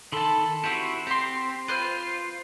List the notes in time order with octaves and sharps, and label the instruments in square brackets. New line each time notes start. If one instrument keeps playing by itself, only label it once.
[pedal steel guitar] D#3 B5 C6 [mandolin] A4 A5
[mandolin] C4 G4 [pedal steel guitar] E4 F#4
[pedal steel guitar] C4 [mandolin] G4 C6
[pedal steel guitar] F4 [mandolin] B4 C5 F6